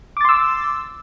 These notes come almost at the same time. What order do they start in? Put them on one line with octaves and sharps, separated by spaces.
D6 A6 C6 E6